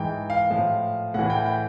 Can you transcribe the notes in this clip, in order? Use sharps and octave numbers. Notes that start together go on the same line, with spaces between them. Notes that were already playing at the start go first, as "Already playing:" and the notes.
Already playing: G#2 E3 G5
F5
A2 F3
A2 E3 F#5
G5
G5